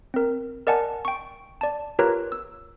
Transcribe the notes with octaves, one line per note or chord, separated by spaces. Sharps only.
C4 A#4
A#4 D5 D#5 F#5 G#5 A5
G5 C#6
D5 A5
F4 G4 A#4 B4 C#5 A#5
E6